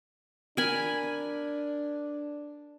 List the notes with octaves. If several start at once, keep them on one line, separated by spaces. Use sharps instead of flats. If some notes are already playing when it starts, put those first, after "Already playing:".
D4 A#4 G#5 B5